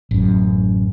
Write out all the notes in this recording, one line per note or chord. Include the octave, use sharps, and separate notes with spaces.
A1 F#2